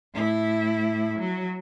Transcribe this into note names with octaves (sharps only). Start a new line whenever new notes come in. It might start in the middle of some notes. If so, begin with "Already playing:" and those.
A2 E4
F#3